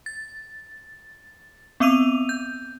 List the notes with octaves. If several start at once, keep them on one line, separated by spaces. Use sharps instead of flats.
A6
B3 C4 D6 E6 D#7 F7
G6